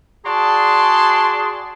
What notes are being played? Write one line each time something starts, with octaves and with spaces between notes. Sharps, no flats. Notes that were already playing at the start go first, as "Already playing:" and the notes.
F#4 G#4 D5 A5 C6